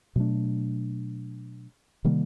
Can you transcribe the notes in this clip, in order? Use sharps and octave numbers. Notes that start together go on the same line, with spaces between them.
B2 F#3 A3 D4
C3 D#3 G3 A#3